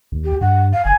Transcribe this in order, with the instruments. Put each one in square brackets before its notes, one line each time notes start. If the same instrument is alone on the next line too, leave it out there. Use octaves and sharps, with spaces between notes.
[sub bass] D#2
[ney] G4
[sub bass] G2 [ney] F#5
[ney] F5
[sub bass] F#1 [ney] G#5